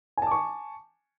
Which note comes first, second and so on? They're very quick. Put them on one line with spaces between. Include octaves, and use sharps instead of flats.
G#5 A5 D6 C#6